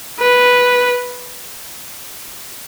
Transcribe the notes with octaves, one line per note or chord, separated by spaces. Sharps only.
B4